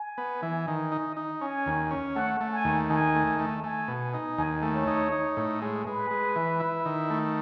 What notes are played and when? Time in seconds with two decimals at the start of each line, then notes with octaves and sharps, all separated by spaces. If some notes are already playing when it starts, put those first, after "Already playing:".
Already playing: G#5
0.18 B3
0.42 E3
0.68 D#3
0.92 D#4
1.17 D#4
1.41 C#4 G#5
1.66 D#2
1.91 C#4
2.15 A3 F#5
2.41 A3
2.53 G#5
2.65 D#2
2.90 D#3 G#5
3.15 A3
3.39 A3
3.64 A3 G#5
3.88 B2
4.14 D#4
4.38 D#2 G#5
4.63 A3
4.75 C#5
4.87 D#4
5.12 D#4
5.37 A2
5.62 G#3
5.86 G#3 B4
6.11 G#3
6.36 E3
6.60 E4
6.86 D#3
7.10 A3